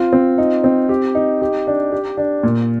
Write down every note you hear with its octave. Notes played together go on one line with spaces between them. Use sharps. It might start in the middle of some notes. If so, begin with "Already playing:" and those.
Already playing: C4 F4
C4
D#4
C4
G4
D#4
G4
D4
G4
D4
A#2